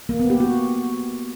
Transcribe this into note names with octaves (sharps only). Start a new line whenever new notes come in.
A#3
B3
G4
F#4